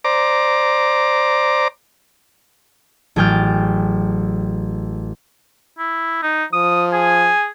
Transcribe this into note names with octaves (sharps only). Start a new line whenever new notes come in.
C5 D5 A#5 D6
A1 F#3 G#4 G5 F6 A6
E4
D#4
F3 D#6
G#4 G#5